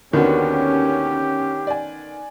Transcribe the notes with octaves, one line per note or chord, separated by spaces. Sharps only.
D#2 D3 D#3 B3 C#4 F#4 G4
D5 G#5